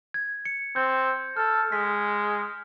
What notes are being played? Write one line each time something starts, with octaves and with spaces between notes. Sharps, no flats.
G#6
C#7
C4 G6
A4 F6
G#3 B6